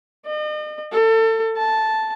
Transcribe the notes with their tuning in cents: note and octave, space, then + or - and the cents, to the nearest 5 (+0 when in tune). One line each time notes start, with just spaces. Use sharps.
D#5 -40
A4 +30
A5 -5